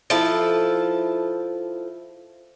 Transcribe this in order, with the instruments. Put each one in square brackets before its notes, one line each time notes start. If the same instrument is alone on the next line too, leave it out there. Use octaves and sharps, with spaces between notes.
[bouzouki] F3 E4 A4